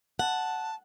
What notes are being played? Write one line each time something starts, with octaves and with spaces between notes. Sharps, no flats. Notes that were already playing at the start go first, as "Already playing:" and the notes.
F#5 A5